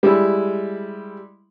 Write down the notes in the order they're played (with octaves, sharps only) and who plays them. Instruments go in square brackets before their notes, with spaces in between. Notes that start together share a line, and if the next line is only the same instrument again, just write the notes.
[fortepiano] G3 G#3 E4